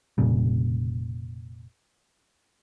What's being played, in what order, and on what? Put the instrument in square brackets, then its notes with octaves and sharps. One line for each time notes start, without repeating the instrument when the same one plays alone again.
[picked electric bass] F1 A#2 C#3 G3